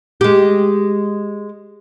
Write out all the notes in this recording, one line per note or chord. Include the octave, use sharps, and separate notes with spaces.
G#3 G4